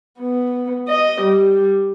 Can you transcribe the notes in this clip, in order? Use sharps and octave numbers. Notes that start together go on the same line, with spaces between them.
B3
D#5
G3